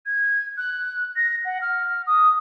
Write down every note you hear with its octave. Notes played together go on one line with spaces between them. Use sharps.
G#6
F#6
A#6
F#5
F6
D#6